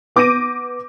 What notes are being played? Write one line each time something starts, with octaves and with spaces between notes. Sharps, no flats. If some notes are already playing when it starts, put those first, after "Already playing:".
B3 D6 G6 A#6 D7 D#7